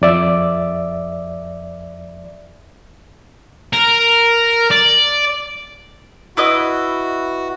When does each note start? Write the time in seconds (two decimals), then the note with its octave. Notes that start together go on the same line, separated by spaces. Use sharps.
0.02 F2 D5 E5
3.73 A#4
4.71 D5
6.37 E4 F#4 B4 D#5